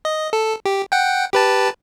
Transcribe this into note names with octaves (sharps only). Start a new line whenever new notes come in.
D#5
A4
G4
F#5 G5
G4 B4 A5